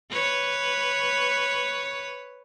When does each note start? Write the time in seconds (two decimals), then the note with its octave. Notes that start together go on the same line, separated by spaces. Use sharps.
0.11 B4 C#5